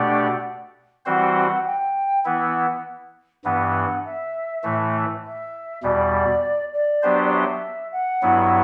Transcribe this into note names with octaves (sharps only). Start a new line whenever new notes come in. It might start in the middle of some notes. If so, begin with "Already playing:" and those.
Already playing: B2 A3 D4 G4 D5 F#5
E3 G3 C4 F#4 C5 F#5 G5
G5
E3 B3 E4 F#5
G2 E3 B3 F#5
E5
A2 E3 A3
E5
E2 B2 G3 D5
D5
F#3 B3 D4 G4 C5
D5
E5
F#5
G2 F#3 B3 E4